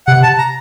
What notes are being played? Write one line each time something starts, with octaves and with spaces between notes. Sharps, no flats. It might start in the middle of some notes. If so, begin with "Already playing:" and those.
C3 F#5
A5
A#5